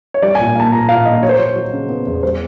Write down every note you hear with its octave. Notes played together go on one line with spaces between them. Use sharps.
C#5
G3 D5
G#5
A#2
A#3 A5
A#2 A#5
A#2 F5
A#2 D#5
F#3 C#5
C5
F#3 C#5
F#3
C#3
B3
E2
G3 C5